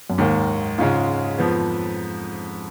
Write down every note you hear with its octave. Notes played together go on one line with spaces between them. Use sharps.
F#2
D#2 G#2 D#3 A#3
G#2 C#3 G#3 C#4 F4
F2 F3 B3